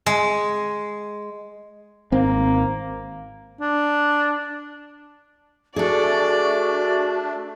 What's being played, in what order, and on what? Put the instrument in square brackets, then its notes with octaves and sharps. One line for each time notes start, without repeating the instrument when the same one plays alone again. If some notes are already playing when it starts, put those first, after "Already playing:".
[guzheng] G#3
[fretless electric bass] G#1 C4 [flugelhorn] A#3
[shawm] D4
[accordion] A3 D4 [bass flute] F#4 [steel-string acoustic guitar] G#4 A4 [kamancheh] D5